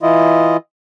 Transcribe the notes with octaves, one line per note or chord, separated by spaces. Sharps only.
E3 E4 F4 D#5